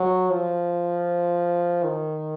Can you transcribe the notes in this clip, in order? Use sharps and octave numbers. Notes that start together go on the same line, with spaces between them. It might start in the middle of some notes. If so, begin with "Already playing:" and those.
Already playing: F#3
F3
D#3